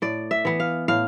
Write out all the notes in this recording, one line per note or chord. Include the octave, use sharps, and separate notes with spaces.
A2 D5
E5
E3 B3
F5
A2 F5